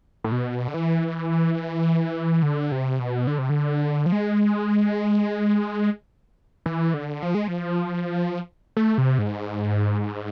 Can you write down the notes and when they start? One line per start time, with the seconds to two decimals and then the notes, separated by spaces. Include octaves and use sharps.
0.24 A2
0.32 B2
0.68 D3
0.74 E3
2.42 D3
2.72 C3
2.99 B2
3.27 D3
3.38 C3
3.49 D3
4.06 F3
4.12 G#3
6.66 E3
6.94 D3
7.23 F3
7.35 G#3
7.48 F3
8.77 A3
8.98 C3
9.19 G#2